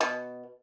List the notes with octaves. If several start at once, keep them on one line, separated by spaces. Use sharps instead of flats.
B2